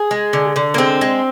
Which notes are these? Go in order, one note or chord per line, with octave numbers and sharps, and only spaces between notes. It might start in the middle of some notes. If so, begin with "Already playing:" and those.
Already playing: G#4
G#3
D3
D3
A#3
G#3 C4
G#3